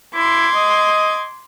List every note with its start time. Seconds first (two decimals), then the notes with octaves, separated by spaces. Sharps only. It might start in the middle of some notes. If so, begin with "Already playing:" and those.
0.15 E4 C6 D6 G#6
0.55 D#5